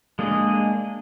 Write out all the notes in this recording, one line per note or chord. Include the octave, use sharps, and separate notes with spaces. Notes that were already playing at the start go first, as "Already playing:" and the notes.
G#3 A#3 D4 G#4 D#5